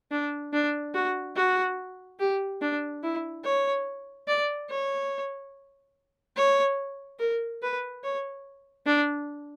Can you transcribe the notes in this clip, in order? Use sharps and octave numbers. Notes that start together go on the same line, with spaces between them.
D4
D4
F#4
F#4
G4
D4
E4
C#5
D5
C#5
C#5
A#4
B4
C#5
D4